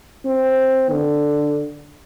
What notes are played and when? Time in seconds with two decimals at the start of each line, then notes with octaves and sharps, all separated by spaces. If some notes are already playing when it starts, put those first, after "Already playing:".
0.25 C4
0.90 D3